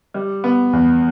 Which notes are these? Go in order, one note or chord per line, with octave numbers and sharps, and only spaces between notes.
G3
B3
E2